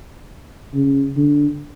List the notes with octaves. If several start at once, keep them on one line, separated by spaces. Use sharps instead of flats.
C#3
D3